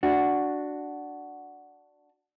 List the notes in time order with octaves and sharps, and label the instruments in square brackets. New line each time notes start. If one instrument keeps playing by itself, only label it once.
[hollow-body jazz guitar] D4 F#4